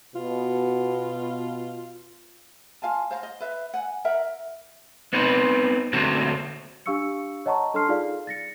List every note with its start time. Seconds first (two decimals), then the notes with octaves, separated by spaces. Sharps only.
0.16 B2 F4
2.82 F4 F5 G#5 A5
3.11 C5 F5 A5 A#5
3.23 D#5
3.40 B4 E5 F5
3.74 F#5 G#5
4.05 A#4 E5 F#5 A#5
5.13 B3 C4 D#4 B4
5.93 D3 A3 A#3 C4 D4 F#4
6.86 D4 G4 F5 C#6 E6 C#7
7.46 C#5 D#5 F#5 A5 A#5 C#6
7.74 D4 A4 A5 C6 F6 C7
7.89 D#4 F4 G#4 D5 F5
8.27 A6 A#6 C#7